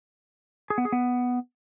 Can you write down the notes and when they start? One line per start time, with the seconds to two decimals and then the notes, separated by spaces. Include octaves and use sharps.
0.70 G#4
0.78 B3
0.85 G#4
0.92 B3